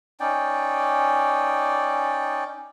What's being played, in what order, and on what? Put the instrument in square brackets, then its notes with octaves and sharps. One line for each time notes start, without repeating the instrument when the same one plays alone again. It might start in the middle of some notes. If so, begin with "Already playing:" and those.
[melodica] C#4 D#4 D5 G5